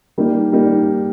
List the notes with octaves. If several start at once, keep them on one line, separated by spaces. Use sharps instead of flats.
G3 A#3 D#4
G3 A#3 D#4